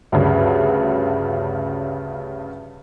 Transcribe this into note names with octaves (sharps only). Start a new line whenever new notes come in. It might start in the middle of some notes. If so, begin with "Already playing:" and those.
D2 G2 C#3